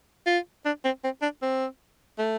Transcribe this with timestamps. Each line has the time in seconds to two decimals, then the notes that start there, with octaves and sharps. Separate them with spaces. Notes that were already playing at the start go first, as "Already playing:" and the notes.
0.27 F4
0.66 D4
0.85 C4
1.04 C4
1.22 D4
1.42 C4
2.18 A3